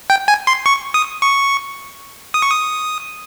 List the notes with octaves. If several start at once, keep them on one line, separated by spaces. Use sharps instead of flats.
G5
G#5
C6
C#6
D#6
C#6
D#6
C#6
D#6